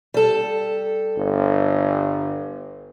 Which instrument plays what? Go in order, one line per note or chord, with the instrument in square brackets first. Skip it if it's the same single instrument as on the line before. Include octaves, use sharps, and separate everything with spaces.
[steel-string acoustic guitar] G3 A4
[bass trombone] G1